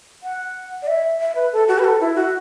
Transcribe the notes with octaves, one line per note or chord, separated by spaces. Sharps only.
F#5
D5
E5
E5
B4
A4
F#4
B4
A4
E4
F#4